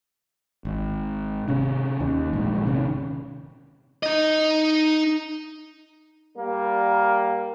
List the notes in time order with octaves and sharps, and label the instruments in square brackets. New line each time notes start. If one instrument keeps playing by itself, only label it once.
[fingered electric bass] G#1
C3 C#4
D#2
A#1 G#2
C3 D#3 C#4
[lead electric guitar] D#4 D#5
[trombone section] G3 A#3 A#4